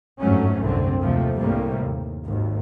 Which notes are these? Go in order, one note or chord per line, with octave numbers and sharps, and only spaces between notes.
G1 F2 G#2 F#3 A3 C#4
C2 F#2 D3 C4
D#2 C3 F3 A3
G1 C2 A2 C3 G3 A#3
D#2
G#1 D#2